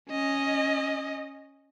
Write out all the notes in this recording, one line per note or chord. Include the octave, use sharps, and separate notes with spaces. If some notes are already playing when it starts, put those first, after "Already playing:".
C#4 D#5